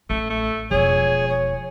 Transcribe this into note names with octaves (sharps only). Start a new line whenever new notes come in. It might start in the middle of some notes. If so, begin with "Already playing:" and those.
A1 A3
A3
E1 F3 G#4 C#5
C#5